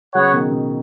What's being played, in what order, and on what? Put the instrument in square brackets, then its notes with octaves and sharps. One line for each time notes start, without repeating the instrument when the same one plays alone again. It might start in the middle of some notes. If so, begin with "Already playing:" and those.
[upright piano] C#3 F#3 [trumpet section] B3 F#4 C#5 F#5
[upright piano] B2 D#3
B2